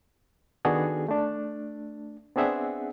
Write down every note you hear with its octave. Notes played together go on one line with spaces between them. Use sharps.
D#3 B3 D4 F#4 G#4 A4
A3 D4
B3 C4 D4 G#4 E5 F#5